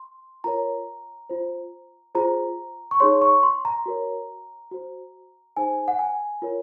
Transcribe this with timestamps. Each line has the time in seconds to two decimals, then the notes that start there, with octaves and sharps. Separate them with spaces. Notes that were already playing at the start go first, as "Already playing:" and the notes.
Already playing: C6
0.44 F4 A#4 C#5 A#5
1.30 F4 C5
2.15 F4 G#4 C5 A#5
2.91 C#6
3.00 D#4 G#4 C#5 C6
3.21 C#6
3.43 C6
3.65 A#5
3.86 F#4 A#4 C#5
4.71 F#4 C5
5.57 D#4 G#4 C5 G#5
5.88 F#5
5.99 G#5
6.42 F4 A#4 C#5